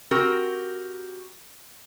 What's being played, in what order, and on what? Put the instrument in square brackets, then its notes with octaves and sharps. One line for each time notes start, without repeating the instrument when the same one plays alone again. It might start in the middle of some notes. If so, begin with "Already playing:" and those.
[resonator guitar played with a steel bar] C4 F#4 G4 A#4